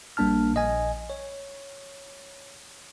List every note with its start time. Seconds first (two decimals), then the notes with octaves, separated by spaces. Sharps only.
0.17 A#1 G3 A#3 D4 A5 F6
0.55 A#1 D#5 G#5
1.10 C#5